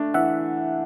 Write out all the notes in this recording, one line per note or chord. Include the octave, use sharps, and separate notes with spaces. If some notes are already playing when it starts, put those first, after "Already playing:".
Already playing: A3 D4
E3 E5 F#5